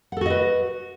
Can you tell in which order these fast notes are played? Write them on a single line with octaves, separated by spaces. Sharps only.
F#5 A4 F#4 D#5 B4